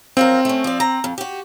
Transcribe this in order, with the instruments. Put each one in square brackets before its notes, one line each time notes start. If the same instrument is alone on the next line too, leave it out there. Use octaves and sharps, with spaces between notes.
[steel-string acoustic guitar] F3 F#3 A#4 [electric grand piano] C4
[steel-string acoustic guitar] A3 C#4
F3 D5
A#5
F2
F#4 G4